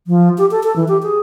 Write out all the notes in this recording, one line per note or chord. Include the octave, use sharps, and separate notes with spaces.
F3
G4
A4
A4
E3
G4
G#4